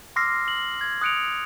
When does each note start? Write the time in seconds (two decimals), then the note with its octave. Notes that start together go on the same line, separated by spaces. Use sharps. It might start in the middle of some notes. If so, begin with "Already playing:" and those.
0.16 C6 D6 E6 F6 A#6 C7
0.48 F#7
0.81 G#6
1.01 D#6 F#6 C#7 D7 F7